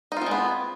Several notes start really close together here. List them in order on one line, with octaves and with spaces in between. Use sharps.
D#4 F4 C4 G#3 B3